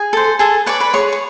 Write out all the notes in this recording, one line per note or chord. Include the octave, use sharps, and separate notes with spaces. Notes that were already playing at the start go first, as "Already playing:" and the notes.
Already playing: G#4 G#5
A4 C5
G#4 A4 A5
B4 C#5 D5 C#6
B4 B5
G#4 C#5 C#6
C#6